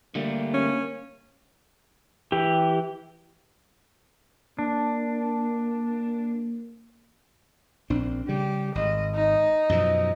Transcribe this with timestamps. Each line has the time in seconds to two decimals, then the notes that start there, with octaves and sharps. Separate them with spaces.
0.15 D3 G3 A3 A#3
0.54 C#4
2.32 E3 G4
4.59 A#3 D4
7.90 A#1 C4 D4
8.28 C#3 G3 G4
8.75 G#1 D#5
9.15 D#4
9.69 F#2 B2 F3